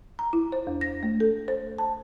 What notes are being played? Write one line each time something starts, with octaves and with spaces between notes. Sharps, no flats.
A#5
E4
C5
E2
A#6
A3
A4
C5
A5